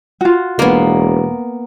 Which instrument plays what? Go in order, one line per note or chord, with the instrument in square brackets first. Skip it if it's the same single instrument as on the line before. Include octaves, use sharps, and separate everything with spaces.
[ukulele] F4 F#4
[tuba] E1 [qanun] A#3 B3